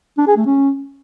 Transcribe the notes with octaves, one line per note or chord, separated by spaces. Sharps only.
D4
G#4
A3
C#4